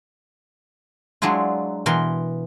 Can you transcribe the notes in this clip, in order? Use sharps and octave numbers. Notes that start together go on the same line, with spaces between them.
F#3 G#3 D4 E4 F4
B2 E3 A#4 C6